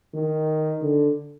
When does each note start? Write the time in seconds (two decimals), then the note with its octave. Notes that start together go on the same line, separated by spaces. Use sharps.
0.14 D#3
0.82 D3